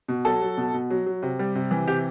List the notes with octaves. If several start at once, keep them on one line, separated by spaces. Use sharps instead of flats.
B2
F#3 A4
F#3
B2
B2
F#3
F#3
C3
G3
C3
E3
C3 G4